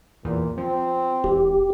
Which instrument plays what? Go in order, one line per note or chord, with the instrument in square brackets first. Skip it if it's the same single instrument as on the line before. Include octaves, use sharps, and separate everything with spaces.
[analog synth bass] E2 [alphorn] A#2
[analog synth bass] F3 [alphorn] C4
[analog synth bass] E1 [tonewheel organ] G4